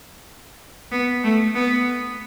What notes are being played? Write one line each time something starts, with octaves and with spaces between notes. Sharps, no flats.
B3
A3
B3